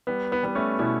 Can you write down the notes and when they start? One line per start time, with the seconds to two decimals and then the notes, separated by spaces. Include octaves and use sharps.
0.07 G3 B3
0.32 B3
0.43 G3 B3
0.55 A3 C#4
0.79 B2 C#4 E4